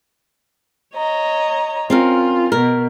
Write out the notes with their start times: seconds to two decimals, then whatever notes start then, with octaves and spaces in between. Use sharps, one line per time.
0.95 C#5 D#5 A#5
1.90 C4 C#4 F4 A#4
2.52 B2 A#4